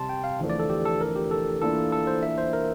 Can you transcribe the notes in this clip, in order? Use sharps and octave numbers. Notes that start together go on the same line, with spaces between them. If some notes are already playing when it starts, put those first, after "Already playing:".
Already playing: C3 G3 C4 A5 C6
G5
F5
E2 D3 F3 A3 D4
D5
A4
G4
A4
A#4
G4
A4
E3 A#3 D4 F4 A4
A4
C5
E5
C5
A#4